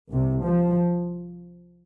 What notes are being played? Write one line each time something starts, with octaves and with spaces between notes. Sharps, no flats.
C2 C3
F3